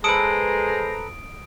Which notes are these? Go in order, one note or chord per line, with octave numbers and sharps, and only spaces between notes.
G#3 A4 B4 C5 A#5 D#6 D7